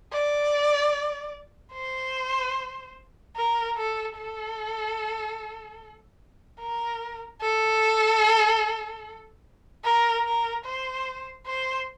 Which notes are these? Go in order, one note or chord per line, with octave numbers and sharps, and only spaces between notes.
D5
C5
A#4
A4
A4
A#4
A4
A#4
A#4
C5
C5